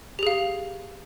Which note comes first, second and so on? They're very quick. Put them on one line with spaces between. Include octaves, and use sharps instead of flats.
G4 G#4 F5